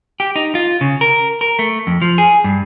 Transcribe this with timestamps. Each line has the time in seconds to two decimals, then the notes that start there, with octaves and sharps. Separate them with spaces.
0.20 G4
0.36 D#4
0.55 F4
0.81 C#3
1.01 A#4
1.41 A#4
1.59 A3
1.87 F2
2.02 F3
2.18 G#4
2.44 G2